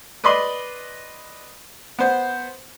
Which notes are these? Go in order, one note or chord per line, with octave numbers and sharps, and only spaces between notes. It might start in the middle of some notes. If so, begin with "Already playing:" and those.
B4 D5 D#5 B5 C6
B3 C5